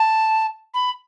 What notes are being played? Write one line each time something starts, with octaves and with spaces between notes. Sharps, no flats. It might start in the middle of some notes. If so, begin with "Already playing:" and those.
Already playing: A5
B5